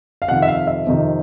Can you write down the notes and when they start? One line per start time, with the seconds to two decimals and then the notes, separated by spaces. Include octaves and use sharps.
0.22 F5
0.28 F2 C3 D#3 F#5
0.42 E5
0.48 F5
0.67 E5
0.87 F2 C3 D#3